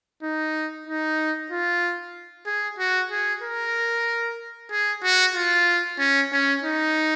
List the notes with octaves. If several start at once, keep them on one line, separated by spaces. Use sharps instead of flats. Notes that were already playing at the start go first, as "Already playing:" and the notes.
D#4
D#4
F4
G#4
F#4
G#4
A#4
G#4
F#4
F4
C#4
C#4
D#4